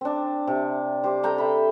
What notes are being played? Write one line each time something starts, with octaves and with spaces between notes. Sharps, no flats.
C4 D4
C3
G4 C5
A4 G5 A#5
E5 B5